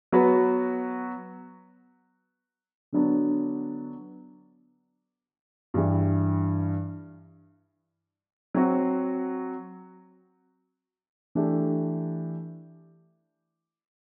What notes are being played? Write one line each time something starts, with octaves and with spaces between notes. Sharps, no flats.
F#3 B3 F#4 B4
D3 F#3 B3 D4
G2 E3 G3
F#3 C4 F#4
E3 A3 D4 G4